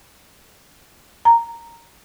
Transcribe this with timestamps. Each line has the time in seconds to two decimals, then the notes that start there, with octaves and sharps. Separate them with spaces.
1.25 A#5